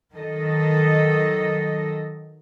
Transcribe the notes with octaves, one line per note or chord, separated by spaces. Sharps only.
D#3 F#3 A4 D#5